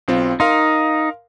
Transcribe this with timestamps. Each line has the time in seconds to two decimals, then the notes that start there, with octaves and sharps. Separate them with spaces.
0.08 B1 C4 F4
0.40 D#4 A#4 F5 C6